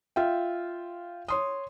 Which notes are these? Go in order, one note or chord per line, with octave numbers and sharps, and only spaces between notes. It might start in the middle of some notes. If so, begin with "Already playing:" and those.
F4 E5 G5
C#5 C6 D#6